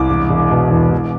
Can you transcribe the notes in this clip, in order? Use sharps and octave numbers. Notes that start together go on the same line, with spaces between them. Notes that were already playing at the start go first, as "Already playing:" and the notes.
Already playing: C2 D6
E1
E1
B2
E2
E1